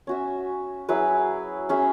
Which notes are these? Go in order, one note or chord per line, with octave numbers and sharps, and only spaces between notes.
C#4 F#4 E5
F#3 E4 G#4 B4
C#4 G#4 E5